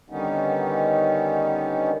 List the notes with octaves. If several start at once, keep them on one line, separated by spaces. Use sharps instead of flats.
D3 D#3 G3 B3 C#4 D#4